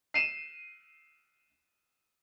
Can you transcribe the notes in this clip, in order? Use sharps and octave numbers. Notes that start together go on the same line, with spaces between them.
C7 D#7 E7